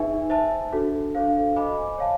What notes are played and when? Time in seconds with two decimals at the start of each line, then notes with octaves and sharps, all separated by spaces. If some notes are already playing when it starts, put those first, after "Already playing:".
Already playing: D#4 G#4 B4 E5 G#5
0.30 C5 E5 A5
0.72 D4 F#4 A4
1.15 D4 F#4 A4 C5 F5
1.56 C5 D#5 G#5 B5 D6
1.98 C#5 F5 A5